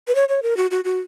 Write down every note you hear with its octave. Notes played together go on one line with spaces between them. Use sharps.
B4
C#5
C#5
A#4
F#4
F#4
F#4